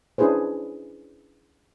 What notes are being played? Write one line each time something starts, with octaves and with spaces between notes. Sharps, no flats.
C#4 D4 E4 G#4 B4 C5